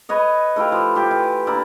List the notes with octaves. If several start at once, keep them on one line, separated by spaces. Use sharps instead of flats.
B4 C#5 D#5
A3 E4 G4 F5
F3
F4 G4 D6
E3
A#3 D4 E4 D5